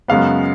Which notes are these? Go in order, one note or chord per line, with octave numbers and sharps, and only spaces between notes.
F#2 C#3 G#3 B3 F5